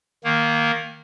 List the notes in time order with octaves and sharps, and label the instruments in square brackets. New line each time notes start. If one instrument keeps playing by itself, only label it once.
[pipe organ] D#3 A#3